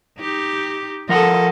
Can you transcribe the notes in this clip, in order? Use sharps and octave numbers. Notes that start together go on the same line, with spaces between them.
D#4 G4
F3 A4 A#4 D#5 F#5